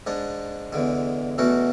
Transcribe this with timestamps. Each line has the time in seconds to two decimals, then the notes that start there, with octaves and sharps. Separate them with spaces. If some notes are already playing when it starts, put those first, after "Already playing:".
0.07 G#2 G#3 D4
0.73 E2 D3 G#3
1.38 E2 B2 A3 C#4 F#4